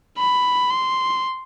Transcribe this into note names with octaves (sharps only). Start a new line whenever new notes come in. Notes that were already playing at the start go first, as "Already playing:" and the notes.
B5
C6